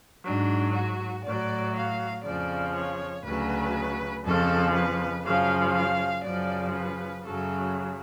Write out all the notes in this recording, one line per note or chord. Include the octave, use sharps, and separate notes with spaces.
G#2 F#3 D4
F#4
A2 F#3 D5
F5
F2 C#3 F3 D5
C#5
D2 C#3 F#3 B4
F2 C#3 F3 A4
B4
F#2 C#3 F3 F5
F5
F#2 C#3 F3 D5
B4
F#2 C#3 F#3 A4